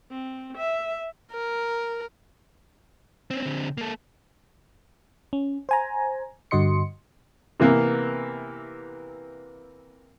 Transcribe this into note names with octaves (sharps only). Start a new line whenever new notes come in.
C4
E5
A#4
C4 C#4
D3 C4
A#3 A4
C#4
C5 G#5 A#5
G2 D3 F#4 D#5 C6 C#7
C3 E3 A#3 B3